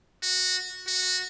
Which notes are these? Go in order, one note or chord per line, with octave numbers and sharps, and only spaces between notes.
F#4
F#4